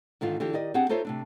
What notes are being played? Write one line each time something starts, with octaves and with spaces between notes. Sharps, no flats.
G#2 D3 D#3 F4
D3 E3 F4 G4
D#3 G4 D5 D#5
C4 D4 G4 G#4 F#5
D#4 F4 A4 C5 C#5 E5
C3 A3 D4